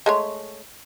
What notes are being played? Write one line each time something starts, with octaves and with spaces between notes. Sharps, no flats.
G#3 A3 C#5